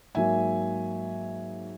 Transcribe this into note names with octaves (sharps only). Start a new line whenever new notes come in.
G#2 F#3 A#3 E5 G#5